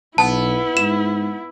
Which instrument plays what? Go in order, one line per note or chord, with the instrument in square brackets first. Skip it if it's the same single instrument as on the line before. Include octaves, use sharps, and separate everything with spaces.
[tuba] B1 [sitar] B3 [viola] E4 [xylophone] A5
[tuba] G#2 [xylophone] E7